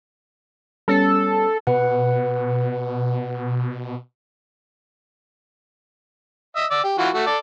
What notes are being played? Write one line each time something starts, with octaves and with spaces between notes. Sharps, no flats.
G3 B3 C#4 A4
B2 B4 F#5
D#5 E5
D5 E6
G4
E3 F4 F#4
A3 F#4
A4 D5